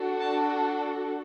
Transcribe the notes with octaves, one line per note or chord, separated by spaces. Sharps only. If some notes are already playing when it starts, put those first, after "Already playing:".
Already playing: D4 F#4 A4
A5